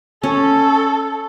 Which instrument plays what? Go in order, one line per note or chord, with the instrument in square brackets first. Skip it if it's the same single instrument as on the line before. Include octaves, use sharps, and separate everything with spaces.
[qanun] C#4 [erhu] A4